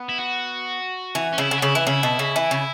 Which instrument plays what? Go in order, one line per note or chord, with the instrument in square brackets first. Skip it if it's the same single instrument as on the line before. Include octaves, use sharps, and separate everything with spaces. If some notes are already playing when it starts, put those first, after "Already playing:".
Already playing: [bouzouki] B3
[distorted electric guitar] E4
F#4
[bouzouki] E3
[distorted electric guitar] C#4
[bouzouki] C#3 [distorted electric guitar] E4
[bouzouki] C#3
[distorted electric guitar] F#4
[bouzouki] C#3 [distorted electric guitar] E4
[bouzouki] E3
[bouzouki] C#3 [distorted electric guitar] E4
[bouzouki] B2
C#3
E3
C#3